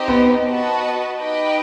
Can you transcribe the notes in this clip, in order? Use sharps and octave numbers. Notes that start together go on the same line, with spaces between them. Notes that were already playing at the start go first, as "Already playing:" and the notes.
Already playing: C4 D#4 G4 C5 D#5
B3
F#4 B4 D#5 A5
D#4 G4 B4 D#5 G5